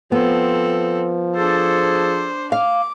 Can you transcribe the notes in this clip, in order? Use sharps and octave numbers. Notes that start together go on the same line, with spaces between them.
F3 B3 C4 A4
D4 G#4 A4 C5
F5 D6